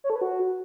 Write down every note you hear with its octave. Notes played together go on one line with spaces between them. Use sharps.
C#5
A4
B4
F#4